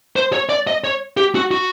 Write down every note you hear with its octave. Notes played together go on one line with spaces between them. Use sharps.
C5
C#5
D5
D#5
C#5
G4
F#4
F#4